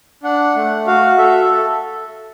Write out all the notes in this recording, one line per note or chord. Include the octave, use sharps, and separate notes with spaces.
D4 F#5
A3
F#4 F5
A4 E5